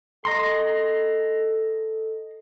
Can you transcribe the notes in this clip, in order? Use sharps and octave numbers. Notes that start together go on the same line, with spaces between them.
A4 D#5 A#5 C6